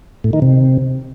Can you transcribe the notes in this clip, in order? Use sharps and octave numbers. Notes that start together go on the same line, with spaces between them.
A2
D#3
C3